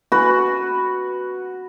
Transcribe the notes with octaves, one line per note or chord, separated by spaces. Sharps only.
F#4 B4